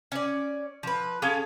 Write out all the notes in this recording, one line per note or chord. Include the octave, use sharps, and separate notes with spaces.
C#4 D5
F3 B4
C#4 G#4 A4 F5